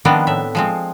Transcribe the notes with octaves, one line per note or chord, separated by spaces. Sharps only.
D#3 F3 G3 B3 C4 D4
A2 E5
F3 G#3 C4